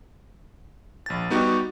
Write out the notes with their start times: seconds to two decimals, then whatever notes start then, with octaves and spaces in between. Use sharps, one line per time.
1.06 A#1 A6
1.30 G3 B3 D#4 F#4 G4